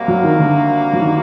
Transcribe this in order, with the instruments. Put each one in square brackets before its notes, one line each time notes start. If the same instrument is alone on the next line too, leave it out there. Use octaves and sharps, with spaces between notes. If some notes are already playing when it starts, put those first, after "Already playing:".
Already playing: [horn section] C3 G3 A#3 F#4
[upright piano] F#3
D#3
D3
F#3
D#3